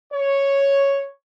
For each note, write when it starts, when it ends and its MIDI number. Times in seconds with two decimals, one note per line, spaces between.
0.12 1.08 73